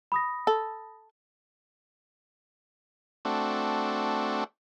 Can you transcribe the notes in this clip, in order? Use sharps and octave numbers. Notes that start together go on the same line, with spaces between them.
B5 D#6 A#6
A4
A3 C4 D4 F#4